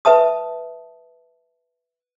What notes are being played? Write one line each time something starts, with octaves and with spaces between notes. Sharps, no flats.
B4 E5 A5 D#6